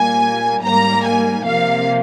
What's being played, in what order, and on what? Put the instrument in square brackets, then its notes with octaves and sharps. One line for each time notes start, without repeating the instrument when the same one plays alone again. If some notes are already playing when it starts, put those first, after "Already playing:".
Already playing: [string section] A#2 G3 A#3 G#5
G#2 G3 A#3 A#5
G#5
C3 F3 A#3 F5